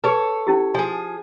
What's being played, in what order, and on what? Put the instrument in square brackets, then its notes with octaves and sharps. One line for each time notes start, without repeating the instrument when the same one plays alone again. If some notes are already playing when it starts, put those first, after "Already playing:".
[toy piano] G#4 B4 [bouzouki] A4 C#5
[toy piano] C#4 E4 G4
[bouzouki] F3 G#4 [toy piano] G#5